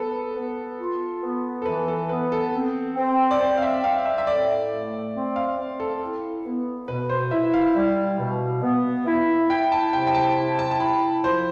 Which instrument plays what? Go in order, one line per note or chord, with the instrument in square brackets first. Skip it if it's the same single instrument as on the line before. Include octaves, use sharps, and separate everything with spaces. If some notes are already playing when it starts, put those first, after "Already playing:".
Already playing: [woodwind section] B3 [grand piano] A4 B4
[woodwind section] B3
F4
B3
[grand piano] A4
[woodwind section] E3 [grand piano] B4
[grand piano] A4
[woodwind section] B3 [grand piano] B4
[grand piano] A4
[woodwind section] C4
C4
[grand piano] D5
[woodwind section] C4 [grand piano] C5
[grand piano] F5
E5
[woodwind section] C4 [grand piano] F5
[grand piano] E5
E5
[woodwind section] A2 [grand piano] D5
[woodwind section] A3
C4
[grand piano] F5
[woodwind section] C4
[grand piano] A4
[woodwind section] E4
B3
[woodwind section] B2 [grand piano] B4
[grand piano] C5
[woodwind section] E4 [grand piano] E5
[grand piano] F5
[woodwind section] G3
B2
B3
E4
[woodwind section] E4 [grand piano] G5
[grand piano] A5
[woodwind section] C3 [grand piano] G5
[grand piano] G5
A5
[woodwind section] E4
[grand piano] A5
A5
[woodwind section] E4 [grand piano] B5
[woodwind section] F3 [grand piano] C5